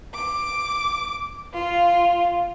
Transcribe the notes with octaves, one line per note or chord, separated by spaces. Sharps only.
D6
F4